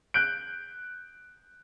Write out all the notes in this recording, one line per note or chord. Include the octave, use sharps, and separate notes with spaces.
F#6 G6 D7